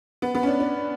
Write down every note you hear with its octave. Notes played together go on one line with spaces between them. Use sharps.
B3
B3
C#4
D4
D4